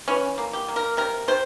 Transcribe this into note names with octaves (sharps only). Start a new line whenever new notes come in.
E3 C#4
A#3
G4
A#3
A#4
C3 A#4
C3 C5